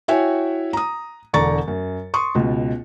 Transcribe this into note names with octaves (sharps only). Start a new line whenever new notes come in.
E4 F#4 C#5 E5 G5 G#5
A#5 D#6
E1 D3 D5 A#5 C#6 A6
F#2
C6 C#6 D#6
C#2 B2